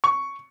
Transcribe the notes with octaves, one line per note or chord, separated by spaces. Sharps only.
C#6